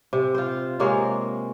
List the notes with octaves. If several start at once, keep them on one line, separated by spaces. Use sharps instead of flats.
C3
F4 C5
C3 G#3 A#3 C#5